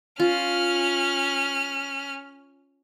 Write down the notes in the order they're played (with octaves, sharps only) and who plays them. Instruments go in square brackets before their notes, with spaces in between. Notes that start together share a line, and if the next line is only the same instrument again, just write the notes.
[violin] C#4 F6 [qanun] F4